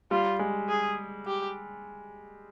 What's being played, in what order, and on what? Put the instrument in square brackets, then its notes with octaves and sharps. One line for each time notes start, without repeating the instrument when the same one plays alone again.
[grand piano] G3 [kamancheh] F4
[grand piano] G#3
[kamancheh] G#4
G4